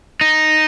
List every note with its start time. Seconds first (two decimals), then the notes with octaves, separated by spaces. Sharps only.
0.21 D#4